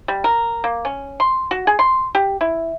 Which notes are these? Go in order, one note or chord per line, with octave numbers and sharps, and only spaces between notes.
G3
A#4
A#3
C#4
C6
F#4
G#4
C6
G4
E4